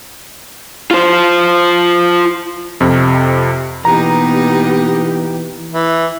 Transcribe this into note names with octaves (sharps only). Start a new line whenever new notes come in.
F4 C5
F2 C3
B2 E3 A#3 B3 D#4 G4 A#5
E3